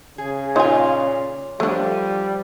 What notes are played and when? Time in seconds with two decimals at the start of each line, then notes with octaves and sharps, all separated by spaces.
0.18 C#3 G#4
0.56 A#2 D#4 F4 C#5 G#5 C6
1.60 F3 G3 A3 D4